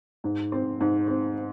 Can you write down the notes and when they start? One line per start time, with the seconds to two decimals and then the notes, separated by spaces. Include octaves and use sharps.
0.24 G#2
0.52 C4
0.80 G#2
1.08 C4